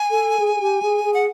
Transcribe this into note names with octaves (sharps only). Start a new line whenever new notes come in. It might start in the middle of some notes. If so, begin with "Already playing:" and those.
Already playing: G#5
A4
G#4
G#4
G4
G#4
G#4
F#5